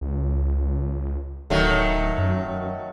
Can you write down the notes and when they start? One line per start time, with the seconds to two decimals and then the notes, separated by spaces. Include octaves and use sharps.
0.01 C#2
1.50 D1 D#3 F#3 A3
2.18 F#2